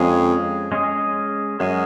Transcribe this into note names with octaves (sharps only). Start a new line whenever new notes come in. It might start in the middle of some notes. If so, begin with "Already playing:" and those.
Already playing: F2 G#3 C#4 G#4 D#5
G#3 C#4 G#4 D#5
F#2 G#3 C#4 G#4 D#5